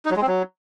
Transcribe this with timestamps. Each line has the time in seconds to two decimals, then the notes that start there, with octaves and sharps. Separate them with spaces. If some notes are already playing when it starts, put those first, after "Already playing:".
0.05 D#4
0.11 F#3
0.16 G#3
0.22 C4
0.27 F#3